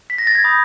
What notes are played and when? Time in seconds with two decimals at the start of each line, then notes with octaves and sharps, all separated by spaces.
0.10 B6
0.18 A#6
0.27 A6
0.35 G#6
0.44 B5 D#6 G6